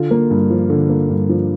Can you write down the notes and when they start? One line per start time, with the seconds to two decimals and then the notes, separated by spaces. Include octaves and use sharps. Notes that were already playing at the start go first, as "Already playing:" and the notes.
Already playing: D3 F4
0.11 A#3
0.30 G2
0.50 F3
0.70 D3
0.89 A#3
1.09 G2
1.29 F3